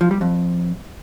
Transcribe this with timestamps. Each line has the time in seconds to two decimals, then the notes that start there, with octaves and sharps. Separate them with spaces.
0.01 F3
0.11 G3
0.21 F2